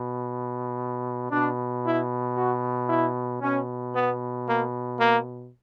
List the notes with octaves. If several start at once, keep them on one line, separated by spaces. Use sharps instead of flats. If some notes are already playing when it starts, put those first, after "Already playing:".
Already playing: B2
B2 D4
E4
F#4
E4
B2 C#4
B3
A#3
A#3